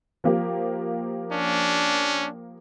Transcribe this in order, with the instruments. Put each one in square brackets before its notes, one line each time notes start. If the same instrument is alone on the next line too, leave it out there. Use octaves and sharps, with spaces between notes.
[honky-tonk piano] F3 A#3 G4
[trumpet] C#4 [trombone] D4